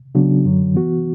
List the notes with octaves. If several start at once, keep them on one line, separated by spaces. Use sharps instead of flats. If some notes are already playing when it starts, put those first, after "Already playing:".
C#3 F#3 B3 D4 F#4
F#2 D3 F#3
E3 B3 F#4